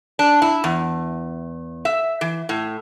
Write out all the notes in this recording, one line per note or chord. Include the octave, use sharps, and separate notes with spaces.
D4
E4
E2
E5
E3
A2